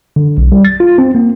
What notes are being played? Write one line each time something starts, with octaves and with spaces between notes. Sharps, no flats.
D3
B1
G3
A6
F4
C4
A#3